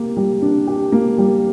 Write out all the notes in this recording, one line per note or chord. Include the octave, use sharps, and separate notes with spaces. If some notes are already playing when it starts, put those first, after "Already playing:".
Already playing: A#3 G4
G3
D4
G4
A#3
G3